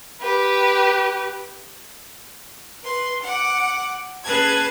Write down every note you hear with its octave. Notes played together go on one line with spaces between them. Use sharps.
G4 B4
B4 C6
F#5 D6
C#4 G#4 B4 A5 G#6